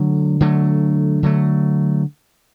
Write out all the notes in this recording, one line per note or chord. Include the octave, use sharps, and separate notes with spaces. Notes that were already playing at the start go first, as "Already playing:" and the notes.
Already playing: D3 F#3 A3
D3 F#3 A3
D3 F#3 A3